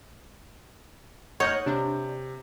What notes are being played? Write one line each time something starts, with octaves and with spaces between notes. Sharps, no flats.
C#5 D#5 F#5 F6 G6 G#6
C3 D4